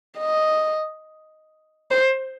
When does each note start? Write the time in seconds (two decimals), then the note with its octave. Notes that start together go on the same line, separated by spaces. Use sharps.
0.18 D#5
1.91 C5